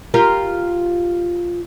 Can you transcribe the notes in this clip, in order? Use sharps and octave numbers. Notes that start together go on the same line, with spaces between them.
F4 G4 A#4